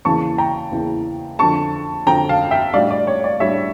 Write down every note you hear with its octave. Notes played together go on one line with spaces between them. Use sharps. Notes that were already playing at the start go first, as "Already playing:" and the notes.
E2 C#3 E3 A#3 E4 A5 C#6
G5 A#5
E2 C#3 E3 A#3 E4
F2 D3 F3 A5 C#6
F2 D3 F3 G5 A#5
F5 A5
E5 G5
A2 G3 D4 D5 F5
D5
C#5
D5
A2 G3 D4 C#5 E5